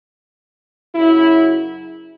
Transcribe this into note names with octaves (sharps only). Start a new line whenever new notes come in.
F#2 C#3 F#3 E4